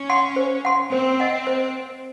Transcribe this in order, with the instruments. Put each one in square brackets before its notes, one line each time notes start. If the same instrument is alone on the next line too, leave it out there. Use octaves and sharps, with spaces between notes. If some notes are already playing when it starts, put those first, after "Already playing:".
Already playing: [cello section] C#4
[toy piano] F#5 C6
C5
F#5 C6
[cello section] C4 [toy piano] C5
[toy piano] D#5 F#5
C5